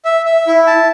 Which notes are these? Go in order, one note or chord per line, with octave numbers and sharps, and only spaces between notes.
E5
E5
E4
A5